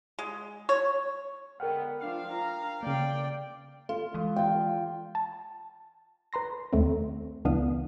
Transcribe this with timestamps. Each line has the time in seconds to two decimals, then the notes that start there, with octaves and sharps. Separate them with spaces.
0.19 G#3
0.69 C#5
1.60 D3 G#3 B3 A#4 F#5 G5 F6
2.01 F3 D4 F5
2.33 A#5
2.83 C#3 A#3 D5 G5
3.89 F4 A4
4.14 E3 G#3
4.36 F4 G5
5.15 A5
6.33 B4 A#5 C6 A#6
6.73 D#2 A3 C4
7.45 C#2 E3 B3 D4 F5 D#6